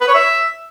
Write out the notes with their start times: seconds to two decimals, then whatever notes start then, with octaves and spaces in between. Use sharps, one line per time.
0.01 B4
0.08 C#5
0.15 E5